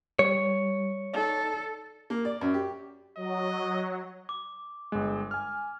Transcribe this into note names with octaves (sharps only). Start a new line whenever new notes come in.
G3 C#5
D#4 A4 D5
A#3
D5
F#2
G4
F#3 D#5
D6
G1 G#3
G#5 F6